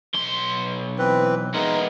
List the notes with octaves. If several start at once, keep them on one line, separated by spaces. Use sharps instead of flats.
B1 C6
E3 C4 B4
G#3 B3 D#4 A#4 C6